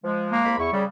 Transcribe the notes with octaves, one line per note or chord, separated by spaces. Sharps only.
F3 G#3
A#3
C2 G#3 B5
E2 E4 C#6
C#3 G3